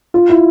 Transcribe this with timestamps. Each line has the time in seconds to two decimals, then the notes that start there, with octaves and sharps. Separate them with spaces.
0.14 F4
0.29 E4